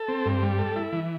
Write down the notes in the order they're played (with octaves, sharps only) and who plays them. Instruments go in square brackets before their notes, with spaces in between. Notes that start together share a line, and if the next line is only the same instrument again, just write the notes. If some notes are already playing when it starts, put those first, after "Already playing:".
Already playing: [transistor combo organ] A4
C4
G2
G3
A4
E4
E3